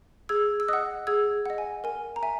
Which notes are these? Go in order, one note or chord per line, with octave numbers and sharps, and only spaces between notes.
G#4 E6 G#6
E6
D#5 F#5 D#6 F#6
G#4 E6 G#6
D#5 F#5
G#5
A#4 G#5
A#5
E5 G#5